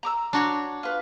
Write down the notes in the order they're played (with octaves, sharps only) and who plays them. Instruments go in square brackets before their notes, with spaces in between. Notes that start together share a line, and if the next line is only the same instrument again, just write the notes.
[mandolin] A#5 D6 E6
[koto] D4 F#4 C#5
[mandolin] F4 B4